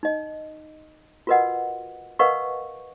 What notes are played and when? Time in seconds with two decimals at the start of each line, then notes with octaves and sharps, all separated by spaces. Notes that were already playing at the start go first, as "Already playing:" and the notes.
0.03 D#4 D#5
1.27 F4 F#4 A#4 B4 D#5 F#5
2.19 A#4 B4 D#5 F5 F#5 C#6